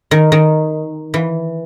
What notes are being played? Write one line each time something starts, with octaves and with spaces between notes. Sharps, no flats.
D#3
D#3
E3